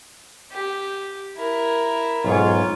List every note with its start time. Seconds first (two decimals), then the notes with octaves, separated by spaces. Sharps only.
0.51 G4
1.36 E4 A#4
2.24 B1 G#2 F4 C#5